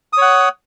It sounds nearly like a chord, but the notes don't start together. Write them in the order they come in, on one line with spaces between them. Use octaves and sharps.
D#6 C#5 F#5